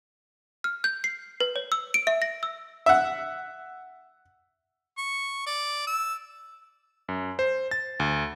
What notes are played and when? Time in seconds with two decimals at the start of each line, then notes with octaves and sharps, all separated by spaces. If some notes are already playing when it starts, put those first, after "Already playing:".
0.64 F6
0.84 G6
1.04 C7
1.40 B4
1.56 C#5
1.72 E6
1.94 D7
2.07 E5
2.22 A#6
2.43 E6
2.86 E5 F#5
4.98 C#6
5.46 D5
5.87 E6
7.09 F#2
7.39 C5
7.71 A6
8.00 D2